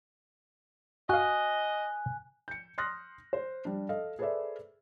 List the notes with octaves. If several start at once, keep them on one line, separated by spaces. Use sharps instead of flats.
F#4 D#5 F5 G#5 F#6
G6 C#7
C6 D#6 F6 F#6 A#6
C5
G3 D4
A4 D#5 F5
G#4 A4 B4 C5 D5 E5